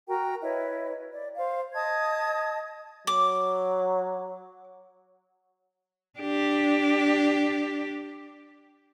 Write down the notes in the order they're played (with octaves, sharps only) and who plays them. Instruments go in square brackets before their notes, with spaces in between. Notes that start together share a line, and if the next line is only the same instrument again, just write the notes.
[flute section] F#4 A#4 G5 A#5
E4 B4 C#5 D#5
D5
C5 F5
D#5 A5 D#6 G#6
[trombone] F#3 [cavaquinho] D6
[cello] D4 G4